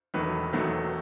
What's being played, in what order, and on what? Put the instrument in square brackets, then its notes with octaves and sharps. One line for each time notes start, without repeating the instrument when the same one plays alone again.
[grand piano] E1 E2 D#3 F#3 A3 B4
E1 E2 D#3 F#3 A3